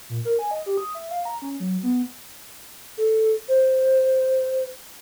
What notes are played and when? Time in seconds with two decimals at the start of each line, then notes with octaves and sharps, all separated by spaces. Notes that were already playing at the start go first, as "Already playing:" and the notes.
0.10 A#2
0.25 A#4
0.39 G#5
0.51 D#5
0.66 G4
0.77 D#6
0.95 E5
1.11 F5
1.25 A#5
1.42 C#4
1.60 F#3
1.83 B3
2.98 A4
3.48 C5